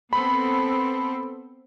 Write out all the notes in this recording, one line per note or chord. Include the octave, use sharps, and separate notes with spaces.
B3 C4 A4 B5